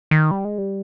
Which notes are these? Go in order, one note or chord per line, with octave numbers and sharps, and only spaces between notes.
D#3
G3
G#3
G3